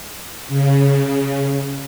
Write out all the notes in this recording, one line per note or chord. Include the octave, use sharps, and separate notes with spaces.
C#3